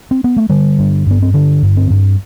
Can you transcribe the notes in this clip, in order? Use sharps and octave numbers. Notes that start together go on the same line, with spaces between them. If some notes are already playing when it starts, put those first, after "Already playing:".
C4
B3
A3
D3 G3
G2
G2 B3
C4
D3 D4
G2
C4
G2